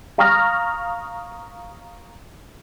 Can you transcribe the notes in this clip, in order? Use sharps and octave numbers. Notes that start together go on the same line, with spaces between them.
F5 A#5 C#6 D#6 F6 A#6